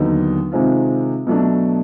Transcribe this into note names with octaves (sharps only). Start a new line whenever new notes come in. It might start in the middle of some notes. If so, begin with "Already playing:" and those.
Already playing: D#2 D3 F#3 B3 D#4
C3 D#3 G#3 C4 F4
B2 F#3 A3 D4